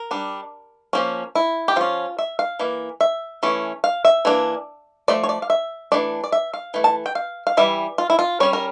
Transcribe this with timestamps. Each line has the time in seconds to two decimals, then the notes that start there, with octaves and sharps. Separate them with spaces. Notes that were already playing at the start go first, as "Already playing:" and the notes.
Already playing: A#4
0.11 G3 D4
0.93 F3 A#3 C#4
1.35 E4
1.68 G4
1.76 F3 C#4 F4
2.19 E5
2.39 F5
2.60 E3 A#3
3.01 E5
3.43 E3 A3 C#4
3.84 F5
4.05 E5
4.25 E3 A#3 D4
5.08 F3 A3 D5
5.24 C#5
5.29 D5
5.42 F5
5.50 E5
5.92 E3 A3 D4 D5
6.24 D5
6.32 E5
6.54 F5
6.74 E3 A3
6.84 A5
7.06 G5
7.15 F5
7.47 F5
7.57 E3 G3 E5
7.98 F4
8.10 E4
8.19 F4
8.40 G3 C#4 C#5
8.53 A#4